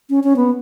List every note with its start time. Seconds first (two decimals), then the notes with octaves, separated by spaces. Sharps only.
0.10 C#4
0.24 C#4
0.36 B3